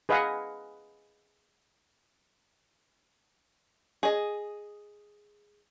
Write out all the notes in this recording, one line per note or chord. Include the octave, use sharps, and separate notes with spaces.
G#4 B4 D#5 F5 F#5 G#5
G#4 D#5